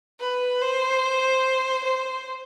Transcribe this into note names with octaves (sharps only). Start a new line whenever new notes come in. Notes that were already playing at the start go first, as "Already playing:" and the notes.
B4
C5
C5